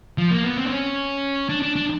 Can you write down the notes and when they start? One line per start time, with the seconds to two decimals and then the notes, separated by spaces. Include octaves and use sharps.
0.18 F3
0.31 A#3
0.44 B3
0.57 C4
0.65 D4
0.70 C#4
1.49 D4
1.62 D4
1.76 D4